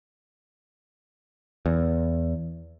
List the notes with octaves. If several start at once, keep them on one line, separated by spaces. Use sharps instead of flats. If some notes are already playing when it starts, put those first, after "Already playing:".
E2